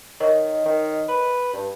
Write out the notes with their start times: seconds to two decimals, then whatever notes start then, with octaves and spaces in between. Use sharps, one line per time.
0.20 D#3 A#4 C#5 D#5
0.66 D#3
1.08 B4
1.53 G2